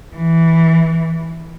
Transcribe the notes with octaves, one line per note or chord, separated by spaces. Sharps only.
E3